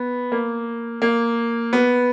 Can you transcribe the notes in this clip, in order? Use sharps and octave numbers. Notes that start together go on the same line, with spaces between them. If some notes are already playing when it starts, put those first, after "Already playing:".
Already playing: B3
A#3
A#3
B3